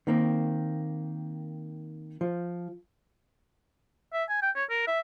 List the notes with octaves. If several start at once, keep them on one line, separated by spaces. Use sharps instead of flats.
D#3 A#3 C4
F3
E5
G#5
G5
C#5
A#4
E5